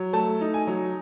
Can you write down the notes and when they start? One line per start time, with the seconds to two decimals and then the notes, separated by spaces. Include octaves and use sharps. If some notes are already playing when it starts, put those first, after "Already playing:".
Already playing: F#3
0.13 A3 A5
0.41 D#4
0.54 G#5
0.67 F#3